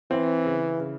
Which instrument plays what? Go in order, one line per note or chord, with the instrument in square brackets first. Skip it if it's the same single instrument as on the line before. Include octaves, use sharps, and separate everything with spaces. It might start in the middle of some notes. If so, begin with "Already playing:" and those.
[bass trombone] E3 [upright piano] C4
[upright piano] C#3
C#3